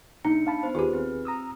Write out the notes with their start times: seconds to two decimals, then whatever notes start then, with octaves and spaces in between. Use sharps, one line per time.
0.25 C2 A#3 D4 D#4 C#7
0.47 F5 A5 B5
0.63 B3 C5
0.75 D#2 F4 G4 G#4 B4
0.93 C4
1.25 A#5 D#6 E6